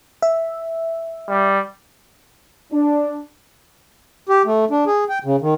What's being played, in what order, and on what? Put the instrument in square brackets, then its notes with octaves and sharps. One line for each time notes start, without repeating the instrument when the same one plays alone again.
[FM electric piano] E5
[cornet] G3
[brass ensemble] D4
[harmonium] G4
A3
D4
G#4
G5
C#3
D#3